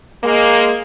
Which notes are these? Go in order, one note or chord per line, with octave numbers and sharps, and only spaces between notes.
G#3 A#3